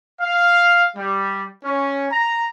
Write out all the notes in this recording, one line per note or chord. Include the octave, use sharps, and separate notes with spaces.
F5
G3
C#4
A#5